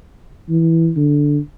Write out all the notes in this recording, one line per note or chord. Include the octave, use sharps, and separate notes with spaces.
E3
D3